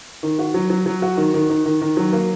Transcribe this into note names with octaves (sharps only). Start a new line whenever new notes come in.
D#3
F#4
F#3
F#3
F#3
F#4
D#3
D#3
D#3
D#3
D#3
F#3
A#3